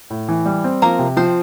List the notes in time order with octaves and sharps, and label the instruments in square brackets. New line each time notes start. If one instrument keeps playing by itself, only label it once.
[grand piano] A2
E3
G3
C4
[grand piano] F3 [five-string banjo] A#3 A#4
[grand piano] C3
[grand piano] F3 [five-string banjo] C4 C5